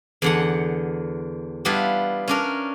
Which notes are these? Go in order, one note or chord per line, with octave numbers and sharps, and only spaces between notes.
E2 D3 F#5
G3 B3 D4 E4 F4
C#4 D4 A#4